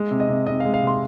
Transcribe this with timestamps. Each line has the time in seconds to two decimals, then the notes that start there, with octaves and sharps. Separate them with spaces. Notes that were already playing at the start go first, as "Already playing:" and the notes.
Already playing: G#3
0.11 C3
0.20 D#5
0.29 C3
0.47 C3 D#5
0.60 F5
0.65 G#3
0.74 F5
0.82 C3
0.87 C6